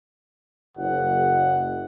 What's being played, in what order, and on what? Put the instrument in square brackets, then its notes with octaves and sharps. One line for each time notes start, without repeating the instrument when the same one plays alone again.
[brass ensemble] F#1 [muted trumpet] F#5